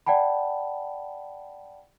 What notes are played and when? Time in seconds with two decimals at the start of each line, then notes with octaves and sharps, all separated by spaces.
0.06 D5 F#5 G5 A5 B5